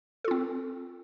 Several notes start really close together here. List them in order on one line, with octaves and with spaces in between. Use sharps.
A4 F4 C4